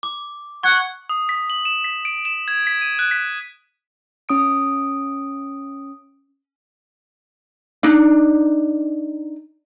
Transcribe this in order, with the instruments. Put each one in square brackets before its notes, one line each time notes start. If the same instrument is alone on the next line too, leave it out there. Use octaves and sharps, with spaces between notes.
[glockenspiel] D6
[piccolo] F#5 [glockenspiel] C#6 G#6
[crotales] D#6
B6
F#7
E7
B6
D7
E7
G#6
B6
D#7
F#6
B6
[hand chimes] C#4 D#6 D7
[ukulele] D4 D#4